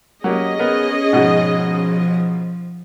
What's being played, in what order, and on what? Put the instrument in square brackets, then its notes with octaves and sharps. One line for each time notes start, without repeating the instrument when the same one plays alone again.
[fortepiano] F#3 A#3 G4 [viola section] C#4 G#4 D#5
[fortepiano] B3 A#4
[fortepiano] G#2 B2 F#4 [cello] F3